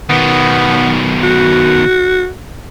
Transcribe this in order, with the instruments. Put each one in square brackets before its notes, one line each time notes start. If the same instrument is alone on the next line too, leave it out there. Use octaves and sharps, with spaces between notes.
[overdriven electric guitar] B2 D#3 [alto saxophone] B3
[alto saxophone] F#4